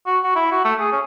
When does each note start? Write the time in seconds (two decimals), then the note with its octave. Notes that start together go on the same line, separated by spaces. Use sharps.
0.07 F#4
0.24 F#4
0.36 E4
0.52 F#4
0.65 A3
0.80 G#4
0.93 C#4